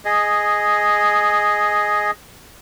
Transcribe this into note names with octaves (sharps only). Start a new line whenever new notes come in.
G#4 D#5